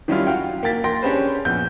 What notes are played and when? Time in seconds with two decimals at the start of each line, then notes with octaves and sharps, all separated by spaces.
0.08 D#3 F#3 G3 C#4 E4 F4
0.27 F#4 F5 G5
0.63 A#3 G5 A6 B6
0.84 A#3 G5 C6 A#6
1.03 C#4 D4 G4 G#4 B4 C5
1.45 A#1 B3 G6